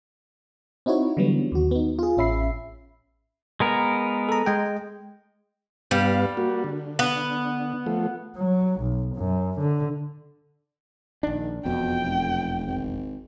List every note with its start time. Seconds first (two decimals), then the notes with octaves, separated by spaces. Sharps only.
0.86 C4 D#4 E4 F#4 C#5
1.17 D3 E3 F#3 G3 B3
1.52 D#2 F#4
1.71 B3 D#4
1.99 F4 G#4
2.17 A1 C#4 E5 B5 C7
3.60 G#3 B3 A#4
4.29 A4 A#5
4.46 G#3 G5
5.91 G2 G3 B3 F5
6.37 A#3 F#4
6.64 D3
6.99 B3
7.86 F3 A3
8.36 F#3
8.80 B1
9.16 F#2
9.60 D3
11.23 A#1 D#3 D4
11.66 E1 F2 B2 G5
12.04 F1
12.66 G#1